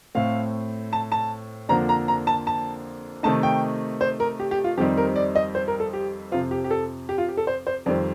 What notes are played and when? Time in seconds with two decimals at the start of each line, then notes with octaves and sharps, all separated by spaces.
0.15 A2 A3 C4 F5
0.93 A5
1.12 A5
1.69 F2 D3 F3 A#3 D4 A#5
1.89 A#5
2.08 A#5
2.27 A5
2.47 A5
3.23 C3 D#3 A3 D#4 A5
3.43 G5
4.01 C5
4.20 A#4
4.40 G4
4.51 G4
4.64 F4
4.77 F2 D#3 G3 C4 D#4 G4
4.97 A#4
5.16 D5
5.35 D#5
5.55 C5
5.68 A#4
5.80 A4
5.93 G4
6.32 F2 C3 F3 F4
6.51 G4
6.64 G4
6.71 A4
7.09 G4
7.18 F4
7.29 G4
7.37 A4
7.47 C5
7.67 C5
7.86 F2 D#3 G3 C4 D5